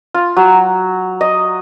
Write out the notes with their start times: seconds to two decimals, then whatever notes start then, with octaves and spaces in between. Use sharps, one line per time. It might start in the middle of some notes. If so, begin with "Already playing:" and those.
0.14 F4
0.37 F#3
1.21 D#5